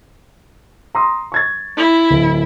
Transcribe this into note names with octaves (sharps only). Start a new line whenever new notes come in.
A#5 C6 D#6
C#6 G#6 A6
E4
D1